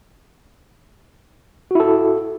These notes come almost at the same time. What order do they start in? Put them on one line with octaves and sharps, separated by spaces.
F#4 E4 A4